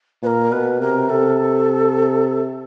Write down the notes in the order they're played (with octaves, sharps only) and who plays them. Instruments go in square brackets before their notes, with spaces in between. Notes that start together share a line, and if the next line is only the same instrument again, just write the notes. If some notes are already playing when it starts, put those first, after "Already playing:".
[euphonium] A#2 [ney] B4
[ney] A#4
[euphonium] B2 [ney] B4
[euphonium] C3 [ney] A#4
[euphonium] C3 [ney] A4